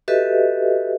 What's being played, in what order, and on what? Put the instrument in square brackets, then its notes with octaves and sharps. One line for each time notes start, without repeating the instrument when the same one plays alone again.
[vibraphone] F#4 G4 A4 B4 D#5 E5